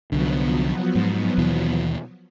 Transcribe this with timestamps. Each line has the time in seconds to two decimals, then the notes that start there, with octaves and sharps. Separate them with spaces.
0.12 C2 D3 F3 F#3 B3
0.95 G#2
1.38 D#2 B2 E3